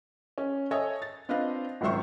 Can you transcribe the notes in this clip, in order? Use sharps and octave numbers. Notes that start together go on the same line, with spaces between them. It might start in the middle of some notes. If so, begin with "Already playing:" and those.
C#4
A4 C#5 D#5 E5 G#5 D#6
A6
C4 D4 F4 B4 D#5 F5
G#1 C#2 F#3 C5 E5 C#6